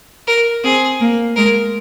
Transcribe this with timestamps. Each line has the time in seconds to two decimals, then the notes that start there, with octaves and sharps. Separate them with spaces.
0.28 A#4
0.64 C4 G#4
1.01 A#3
1.36 G#3 A#4